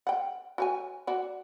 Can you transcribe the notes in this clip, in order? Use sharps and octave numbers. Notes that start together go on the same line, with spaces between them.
F#5 G5
F#4 C#5 G#5
F#4 D5